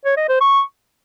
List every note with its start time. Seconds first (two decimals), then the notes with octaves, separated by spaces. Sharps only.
0.05 C#5
0.17 D#5
0.29 C5
0.41 C#6